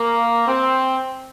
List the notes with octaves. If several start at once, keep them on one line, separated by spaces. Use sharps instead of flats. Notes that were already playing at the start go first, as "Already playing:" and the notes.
Already playing: A#3
C4